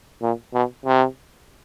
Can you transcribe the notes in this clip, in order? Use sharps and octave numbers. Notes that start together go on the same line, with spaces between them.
A#2
B2
C3